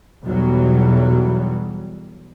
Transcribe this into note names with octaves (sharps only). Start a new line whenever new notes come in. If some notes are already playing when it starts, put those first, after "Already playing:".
B1 E2 B2 F#3 G3